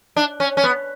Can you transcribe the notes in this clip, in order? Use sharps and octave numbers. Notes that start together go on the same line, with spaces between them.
D4
C#4
C#4
B3